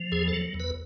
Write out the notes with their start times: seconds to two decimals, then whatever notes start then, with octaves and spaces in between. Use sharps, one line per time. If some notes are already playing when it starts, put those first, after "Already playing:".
Already playing: F3
0.12 E2 G#4
0.28 A4
0.33 F#3
0.54 E2
0.60 B4